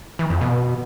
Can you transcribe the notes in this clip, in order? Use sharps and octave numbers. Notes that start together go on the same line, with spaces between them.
E3
F2
B2